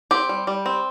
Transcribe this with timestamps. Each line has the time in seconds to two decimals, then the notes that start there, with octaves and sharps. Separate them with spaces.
0.11 C4 G4
0.29 G3
0.47 G3
0.66 C4